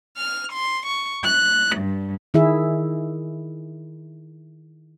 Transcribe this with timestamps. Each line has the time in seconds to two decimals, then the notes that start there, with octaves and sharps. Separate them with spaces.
0.17 F6
0.51 C6
0.85 C#6
1.23 F#6
1.75 G2
2.34 D#3 E4 G#4 E5